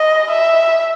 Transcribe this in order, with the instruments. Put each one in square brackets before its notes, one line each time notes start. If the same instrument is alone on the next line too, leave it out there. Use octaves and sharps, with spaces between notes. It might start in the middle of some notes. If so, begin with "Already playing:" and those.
Already playing: [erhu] D#5
E5